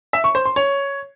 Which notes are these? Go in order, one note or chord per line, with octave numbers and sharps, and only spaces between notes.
E5
C#6
C5
C6
C#5